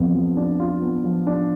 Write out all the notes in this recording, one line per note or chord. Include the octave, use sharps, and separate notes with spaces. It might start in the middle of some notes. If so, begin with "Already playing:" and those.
Already playing: F2 B3 F4
F3
D4
F4
B3
F3
D4